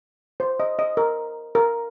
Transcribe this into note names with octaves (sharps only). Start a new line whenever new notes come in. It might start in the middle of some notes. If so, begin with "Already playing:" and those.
C5
D#5
D#5
A#4
A#4